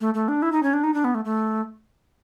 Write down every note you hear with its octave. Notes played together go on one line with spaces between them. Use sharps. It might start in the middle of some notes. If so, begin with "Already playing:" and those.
A3
A3
D4
E4
D#4
C#4
D4
D#4
D4
B3
A3
A3